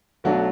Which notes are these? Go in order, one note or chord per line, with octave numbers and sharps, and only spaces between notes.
B1 B2 F#3 A3 D4 F#4